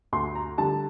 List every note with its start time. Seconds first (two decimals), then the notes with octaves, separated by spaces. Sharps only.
0.13 D2 C6
0.35 A#5
0.58 D3 G3 A5